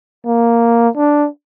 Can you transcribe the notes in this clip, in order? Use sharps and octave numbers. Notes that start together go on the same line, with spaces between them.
A#3
D4